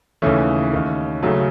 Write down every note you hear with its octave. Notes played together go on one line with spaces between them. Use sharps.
D#2 C#3 E3 A3 C#4
D#2 D#3
F#1 F#2 C#3 F#3 A3